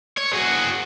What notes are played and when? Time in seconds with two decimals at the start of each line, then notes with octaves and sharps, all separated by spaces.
0.18 C#5
0.33 F#4 G#4